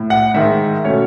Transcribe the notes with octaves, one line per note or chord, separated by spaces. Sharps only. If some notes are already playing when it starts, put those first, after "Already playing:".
Already playing: A2
F#5
G#2 D#3 G#3 E5
B2 A3 C#4 C#5